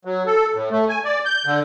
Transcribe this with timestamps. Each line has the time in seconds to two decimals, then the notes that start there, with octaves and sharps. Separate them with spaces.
0.05 F#3
0.26 A4
0.54 A2
0.71 A3
0.89 G#5
1.05 D5
1.25 G6
1.46 D3